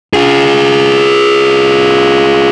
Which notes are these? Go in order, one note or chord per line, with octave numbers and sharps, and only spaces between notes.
F4 G#4